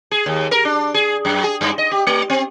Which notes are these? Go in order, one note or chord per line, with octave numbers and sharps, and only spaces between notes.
G#4
D#2
A#4
D4
G#4
F#2
G#4
G2
D#5
G4
A3
C4